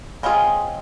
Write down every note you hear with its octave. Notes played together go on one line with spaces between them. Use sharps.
G#3 C4 C#4 F4 G#4